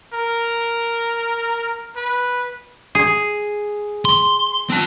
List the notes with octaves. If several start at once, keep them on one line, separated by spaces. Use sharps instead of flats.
A#4
B4
G#4
C6
C4 A5